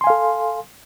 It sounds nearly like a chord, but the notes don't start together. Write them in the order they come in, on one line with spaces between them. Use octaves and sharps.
C6 G#5 F5 A4